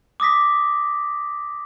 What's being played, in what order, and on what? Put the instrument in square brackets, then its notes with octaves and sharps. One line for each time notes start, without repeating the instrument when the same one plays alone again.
[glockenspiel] D6 D#6 A#6 B6